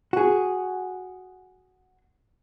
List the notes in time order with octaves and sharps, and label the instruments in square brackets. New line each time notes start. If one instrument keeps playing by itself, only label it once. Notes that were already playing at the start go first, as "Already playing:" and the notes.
[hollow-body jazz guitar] F#4 G#4